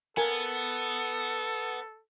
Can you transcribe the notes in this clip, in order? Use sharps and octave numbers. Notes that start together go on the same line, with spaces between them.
B3 A4 A#4 G#5